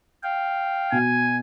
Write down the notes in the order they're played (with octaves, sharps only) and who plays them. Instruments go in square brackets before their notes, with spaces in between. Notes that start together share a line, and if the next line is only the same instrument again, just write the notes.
[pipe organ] F5 G5
[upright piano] B2 [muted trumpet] G#5